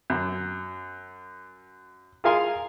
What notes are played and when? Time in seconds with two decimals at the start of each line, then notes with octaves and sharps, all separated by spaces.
0.10 F#2
2.24 F4 G#4 A#4 F5 G#5 C6